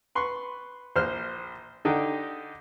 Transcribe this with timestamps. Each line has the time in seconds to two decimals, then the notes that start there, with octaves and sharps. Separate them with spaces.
0.15 B4 C6 C#6
0.96 A#1 C5 F6
1.85 D3 D#4 G4